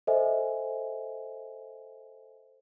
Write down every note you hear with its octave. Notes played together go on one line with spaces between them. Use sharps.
A4 C5 D#5 E5 G#5